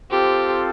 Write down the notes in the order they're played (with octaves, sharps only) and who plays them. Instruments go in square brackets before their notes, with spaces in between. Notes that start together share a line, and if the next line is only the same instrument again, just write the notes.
[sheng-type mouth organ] C4 F4 A4 C5 [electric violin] G4